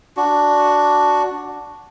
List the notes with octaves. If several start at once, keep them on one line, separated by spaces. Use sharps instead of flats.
D4 F#4